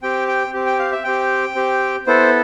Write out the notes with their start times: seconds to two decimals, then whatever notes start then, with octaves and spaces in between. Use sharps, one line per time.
0.02 C4 G4 G5
0.28 G5
0.54 C4 G4
0.66 G5
0.79 F5
0.92 E5
1.04 C4 G4 G5
1.55 C4 G4
2.07 B3 E4 A4 C5